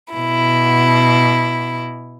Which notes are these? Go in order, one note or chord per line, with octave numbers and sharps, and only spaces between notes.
B2 E4